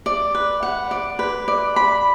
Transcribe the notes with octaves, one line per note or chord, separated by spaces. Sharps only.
D5
B4
F#5
D5
B4
D5
B5